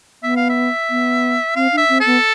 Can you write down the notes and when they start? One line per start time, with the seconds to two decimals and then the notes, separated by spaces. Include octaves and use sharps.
0.23 B3 E5
0.36 F5
0.50 E5
0.90 B3
1.56 C4 F5
1.72 D4
1.78 E5
1.89 C4
2.00 A4
2.06 B3